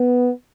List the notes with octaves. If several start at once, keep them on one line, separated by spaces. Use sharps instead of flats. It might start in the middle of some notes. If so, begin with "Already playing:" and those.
Already playing: B3